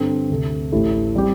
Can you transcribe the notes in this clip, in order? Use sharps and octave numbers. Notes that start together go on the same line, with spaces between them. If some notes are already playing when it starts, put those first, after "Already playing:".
Already playing: G2 D3 C4 A4
D2 C3 A3
A1 A2 A3 E4 G4
G3 C4 G4